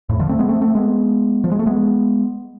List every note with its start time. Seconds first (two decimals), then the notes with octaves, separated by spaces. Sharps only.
0.09 F2 A2
0.19 D3 F3
0.29 A3 C4
0.39 G#3 B3
0.49 A3 C4
0.62 A3 C4
0.75 G#3 B3
1.44 F3
1.52 G#3
1.59 A3
1.66 G#3 B3